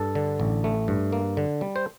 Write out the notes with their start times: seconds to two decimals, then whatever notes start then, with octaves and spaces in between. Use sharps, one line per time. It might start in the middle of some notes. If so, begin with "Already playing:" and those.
Already playing: G2 A4
0.15 D3
0.40 A1
0.64 A3
0.88 G2
1.12 A#3
1.37 D3
1.61 G3
1.76 C5